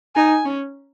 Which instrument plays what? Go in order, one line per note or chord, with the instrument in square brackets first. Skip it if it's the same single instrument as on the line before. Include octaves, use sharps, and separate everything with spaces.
[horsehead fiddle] D#4 [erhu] G#5
[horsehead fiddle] C#4